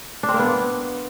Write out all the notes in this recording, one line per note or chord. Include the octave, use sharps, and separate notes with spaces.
D4
C4
A#3
B3